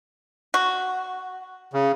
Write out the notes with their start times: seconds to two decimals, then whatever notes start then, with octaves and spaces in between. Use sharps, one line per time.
0.54 F#4
1.73 C#3